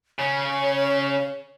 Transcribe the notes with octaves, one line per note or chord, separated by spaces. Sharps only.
C#3 C#4 C#5